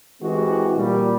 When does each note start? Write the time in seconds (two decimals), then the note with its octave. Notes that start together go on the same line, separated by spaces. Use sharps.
0.23 E3 G#3 C4 F#4 G4
0.77 A#2 G3